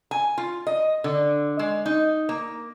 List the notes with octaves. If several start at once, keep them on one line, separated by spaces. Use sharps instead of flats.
G#5
F4
D#5
D3
G#3
D#4
A#3